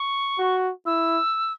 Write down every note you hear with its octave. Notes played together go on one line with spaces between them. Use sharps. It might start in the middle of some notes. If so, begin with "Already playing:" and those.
Already playing: C#6
F#4
E4 E6